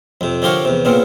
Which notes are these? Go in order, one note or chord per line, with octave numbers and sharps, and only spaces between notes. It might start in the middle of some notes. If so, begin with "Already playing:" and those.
F2 C3
D3 F3 G4 A#4 C#5
E2 C3
A#2 C#3 B3 C4